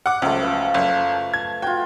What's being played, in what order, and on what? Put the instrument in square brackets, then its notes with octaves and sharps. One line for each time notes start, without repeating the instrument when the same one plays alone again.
[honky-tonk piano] F#5 D6
[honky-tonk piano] C#2 [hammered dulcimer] F3 F#3 A3
[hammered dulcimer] B4 F5
[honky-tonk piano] F#1
G#6
[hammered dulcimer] F4 F#4 [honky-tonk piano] G5